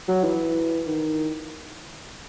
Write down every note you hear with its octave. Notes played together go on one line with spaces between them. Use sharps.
F#3
E3
D#3